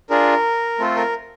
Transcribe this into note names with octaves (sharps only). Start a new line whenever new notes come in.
D4 F4 G#4 A#4
A3 C4 F4 A4
A#4